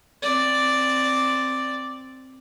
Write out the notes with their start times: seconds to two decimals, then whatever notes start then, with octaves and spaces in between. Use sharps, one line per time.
0.23 C4 D5